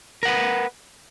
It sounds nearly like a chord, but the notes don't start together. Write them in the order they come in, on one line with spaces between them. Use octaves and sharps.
A#4 F#5 B4